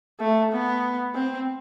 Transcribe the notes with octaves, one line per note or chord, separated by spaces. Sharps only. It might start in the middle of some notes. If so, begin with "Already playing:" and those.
A3
B3
C4